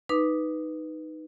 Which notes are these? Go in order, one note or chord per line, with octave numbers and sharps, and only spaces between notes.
D#4 B4 D6